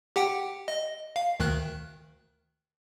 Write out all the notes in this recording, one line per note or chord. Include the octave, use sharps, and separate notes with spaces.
G4 F#5 G5
D#5
F5
D2 D#3 F#6